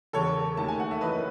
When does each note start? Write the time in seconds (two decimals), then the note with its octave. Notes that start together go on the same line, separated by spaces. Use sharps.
0.13 E1 E2 C#3 A4 C#5
0.57 D#2 D#3 A3 A5
0.68 G#5
0.80 F#5
0.91 E5
1.01 F#1 F#2 E3 B4 D#5